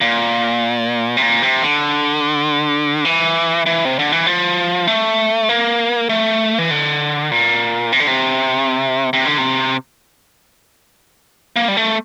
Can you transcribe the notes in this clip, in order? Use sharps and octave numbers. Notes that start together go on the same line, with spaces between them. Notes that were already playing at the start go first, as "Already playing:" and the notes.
A#2
C3
A#2
C3
D3
E3
E3
C3
D3
E3
F3
A3
A#3
A3
E3
D3
A#2
C3
D3
C3
C3
D3
C3
A#3
G3
A3